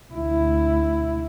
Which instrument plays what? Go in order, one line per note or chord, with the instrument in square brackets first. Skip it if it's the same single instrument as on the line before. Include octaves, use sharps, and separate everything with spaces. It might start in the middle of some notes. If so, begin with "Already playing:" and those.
[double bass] D2 E4